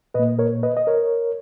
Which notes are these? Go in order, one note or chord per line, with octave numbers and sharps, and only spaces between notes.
A#2 A#3 B4 D#5
A#4 C#5
B4 D#5
D#5
A#4 C#5